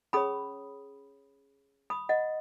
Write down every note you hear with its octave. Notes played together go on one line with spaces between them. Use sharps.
C#4 G#4 C#5 B5 D#6
B5 D#6
D#5 F#5